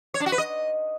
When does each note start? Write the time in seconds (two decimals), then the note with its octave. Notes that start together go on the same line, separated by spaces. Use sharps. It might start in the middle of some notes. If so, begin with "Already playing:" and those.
0.14 C#5
0.20 D4
0.26 F#4
0.32 B4
0.38 D#5